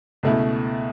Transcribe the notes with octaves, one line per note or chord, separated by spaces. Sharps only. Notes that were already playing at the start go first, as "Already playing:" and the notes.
C#2 B2 A3 E4